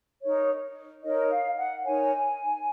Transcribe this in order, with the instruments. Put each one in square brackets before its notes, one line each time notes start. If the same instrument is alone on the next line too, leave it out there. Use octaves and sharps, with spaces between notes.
[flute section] D#4 A#4 C#5
D#4 A#4 C#5 D#5
F5
F#5
D#4 A#4 C#5 G#5